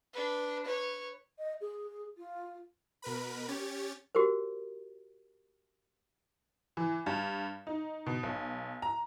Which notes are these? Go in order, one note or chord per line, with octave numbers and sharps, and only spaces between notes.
D4 B4
B4 C#5
D#5
G#4
F4
B2 A#4 B4 B5
C#4 G4 C#5 A6
F#4 G4 A#4 C5
E3
G2
D#4
B2
B1
A#5